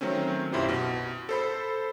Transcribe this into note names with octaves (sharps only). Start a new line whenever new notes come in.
D#3 F#3 A3 C4 C#4
B1 F#2 E4 F4 G4 C5
B2
A4 C5 B5